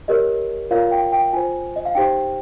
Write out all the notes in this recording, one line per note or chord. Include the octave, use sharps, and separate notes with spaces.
G4 A#4 C#5 D#5
F4 A#4 C#5 F5
G5
G5
F4 C5 G#5
D#5
F5
D#4 G4 C5 G5